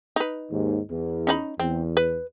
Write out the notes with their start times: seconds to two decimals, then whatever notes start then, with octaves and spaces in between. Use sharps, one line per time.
0.16 D#4 B4
0.52 D#2 G#2
0.91 E2
1.27 C#4 D#4 B5
1.60 E2 C4
1.97 B4